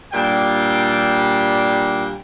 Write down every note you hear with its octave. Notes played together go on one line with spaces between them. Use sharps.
A#2 G3 D4 G5